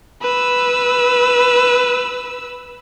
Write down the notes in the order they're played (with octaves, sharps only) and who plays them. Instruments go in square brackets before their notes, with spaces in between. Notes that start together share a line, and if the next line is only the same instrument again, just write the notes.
[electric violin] B4 E6